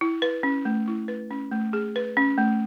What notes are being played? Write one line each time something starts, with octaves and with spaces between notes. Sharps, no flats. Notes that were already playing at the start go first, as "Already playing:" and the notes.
E4
B4
C#4
A3
E4
B4
C#4
A3
G#4
B4
C#4
A3